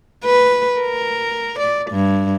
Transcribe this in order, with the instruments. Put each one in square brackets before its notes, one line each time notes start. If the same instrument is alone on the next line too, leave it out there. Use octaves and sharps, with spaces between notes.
[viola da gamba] B4
A#4
D5
G2